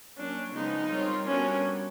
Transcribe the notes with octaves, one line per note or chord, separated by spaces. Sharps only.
F#3 A#3 C#4 D4
C#3 F3 G#3 B3 D#4
G3 C4 F4 A#4 C#5
G3 B3 C#4 D4 F#4 A#4